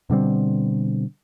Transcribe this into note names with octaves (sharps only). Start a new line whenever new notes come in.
B2 D3 G3 C4